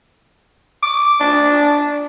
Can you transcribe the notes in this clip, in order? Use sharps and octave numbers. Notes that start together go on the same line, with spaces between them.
D6
D4